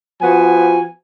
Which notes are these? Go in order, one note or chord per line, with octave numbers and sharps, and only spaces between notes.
F3 B3 F#4 G#5